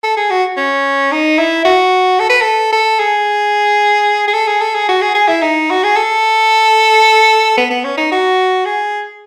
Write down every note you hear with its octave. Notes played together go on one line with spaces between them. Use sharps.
A4
G#4
F#4
C#4
D#4
E4
F#4
A4
B4
A4
A4
G#4
G#4
A4
G#4
A4
G#4
F#4
G#4
G#4
E4
D#4
F#4
G#4
A4
B3
B3
C#4
D#4
F#4
G#4